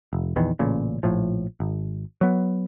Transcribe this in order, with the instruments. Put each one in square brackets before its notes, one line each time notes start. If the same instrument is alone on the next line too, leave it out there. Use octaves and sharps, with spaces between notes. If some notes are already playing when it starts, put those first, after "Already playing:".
[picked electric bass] F1
A#1 E2 D#3 E3
A1 A#2 C#3
A#1 A2 F3
G#1
F#3 B3